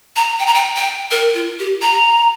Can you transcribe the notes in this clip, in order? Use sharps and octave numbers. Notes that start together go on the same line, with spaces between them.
A#5
G5
A#5
G5
G5
A#4
F4
G4
A#5